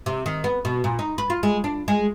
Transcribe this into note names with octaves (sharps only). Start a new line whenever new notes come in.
C3
D#3
B3
B2
A#2
D#4
B4
F4
G#3
D4
G#3